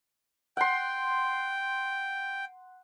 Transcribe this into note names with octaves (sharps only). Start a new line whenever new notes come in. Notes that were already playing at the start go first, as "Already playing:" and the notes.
F#5 G5 C6